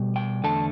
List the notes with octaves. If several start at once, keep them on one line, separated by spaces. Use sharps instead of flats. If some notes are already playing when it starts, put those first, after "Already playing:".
Already playing: B2 G3
G5
E2 D3 A3 A5